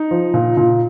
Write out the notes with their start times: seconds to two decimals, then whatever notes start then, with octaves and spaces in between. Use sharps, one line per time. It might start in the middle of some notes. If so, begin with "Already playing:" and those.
Already playing: D#4
0.11 F3
0.34 A#2
0.57 A#2